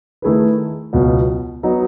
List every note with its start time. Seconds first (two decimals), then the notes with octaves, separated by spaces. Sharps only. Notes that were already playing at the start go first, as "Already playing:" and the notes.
0.22 D#3 A3 E4 G#4 B4
0.93 C#2 B2 F#3 B3
1.63 F#3 B3 D#4